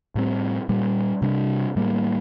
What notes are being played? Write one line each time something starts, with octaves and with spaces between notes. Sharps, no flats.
A2 G3 C4
A#2 G3 A#3
C3 G3 D4
A2 G3 A#3